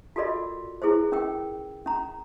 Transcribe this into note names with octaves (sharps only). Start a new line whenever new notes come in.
F4 F#4 A4 A#4 D5 D#5
E4 G#4 B4 C5
C#4 A#4 G5
C#4 A#5